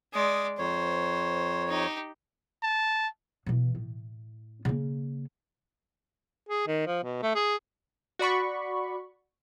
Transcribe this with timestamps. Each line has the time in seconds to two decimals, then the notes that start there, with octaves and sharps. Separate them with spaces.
0.13 G#3 D5 D#6
0.59 F2 C5 C#5
1.68 D#4 G4
2.63 A5
3.46 B2 E3
3.75 A2
4.65 C#3 A#3
6.49 G#4
6.67 D#3
6.86 F3
7.03 B2
7.23 A3
7.35 G#4
8.19 F#4 D5 B5 C#6